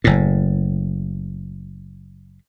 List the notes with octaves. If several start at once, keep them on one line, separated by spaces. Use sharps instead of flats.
F#1 A2